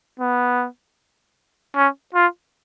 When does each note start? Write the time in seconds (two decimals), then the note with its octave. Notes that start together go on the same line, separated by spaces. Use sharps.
0.20 B3
1.76 C#4
2.15 F4